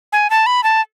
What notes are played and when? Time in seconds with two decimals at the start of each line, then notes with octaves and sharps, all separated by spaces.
0.13 G#5
0.30 A5
0.46 B5
0.64 A5